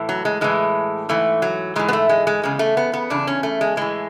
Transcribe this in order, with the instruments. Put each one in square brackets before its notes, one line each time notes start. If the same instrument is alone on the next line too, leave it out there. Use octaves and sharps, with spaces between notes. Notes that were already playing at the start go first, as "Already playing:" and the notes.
Already playing: [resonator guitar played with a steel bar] A2 E3
F#3
G#3
A2 E3 G#3
G#2 E3 A3
F#3
G#2 E3 G#3
B3
A3
G#3
G#3
E2 C#3 G#3
A3
B3
B3
E2 C#3 D4
C#4
A3
G#3
A2 E3 G#3